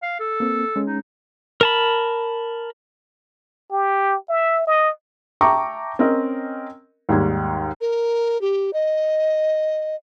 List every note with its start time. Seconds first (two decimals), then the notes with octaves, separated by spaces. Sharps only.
0.02 F5
0.20 A4
0.40 A#3 C4
0.76 G#3 C#4
0.87 D#4
1.61 A#4 A5 B5
3.71 G4
4.29 E5
4.67 D#5
5.41 E5 G5 A5 A#5 C#6 D6
5.99 C4 C#4 A#4 D#5
7.09 D#2 G#2 G3 G#6
7.81 A#4
8.41 G4
8.73 D#5